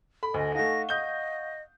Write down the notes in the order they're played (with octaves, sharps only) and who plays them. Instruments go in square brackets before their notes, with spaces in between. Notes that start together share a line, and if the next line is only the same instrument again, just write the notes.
[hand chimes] A4 [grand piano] B5
[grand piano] D2 [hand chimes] A4 F#5 G#5 [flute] D#5
[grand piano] A3 D#4 [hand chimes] F5 F#5 C#6 [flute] A#6
[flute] D#5 [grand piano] D#6 G6 G7